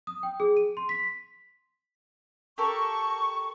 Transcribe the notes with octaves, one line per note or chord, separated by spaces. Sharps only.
D#6
G5
G#4
D#7
C6
B6
G4 A4 A#4 C#6